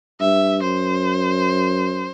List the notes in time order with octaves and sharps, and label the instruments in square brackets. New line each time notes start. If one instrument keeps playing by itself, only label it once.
[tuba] G2 [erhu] E5
[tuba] F#2 [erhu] C5